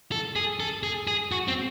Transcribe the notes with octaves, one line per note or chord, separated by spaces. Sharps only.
A4
G#4
A4
G#4
G#4
F#4
C4